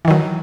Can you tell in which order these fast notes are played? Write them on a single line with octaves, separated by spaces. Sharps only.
E3 D#3 F#3